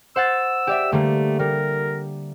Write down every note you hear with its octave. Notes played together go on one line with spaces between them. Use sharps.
C5 F#5 E6 A6
G4 D5 E5
D3 G3 A3 A#3
G3 A#4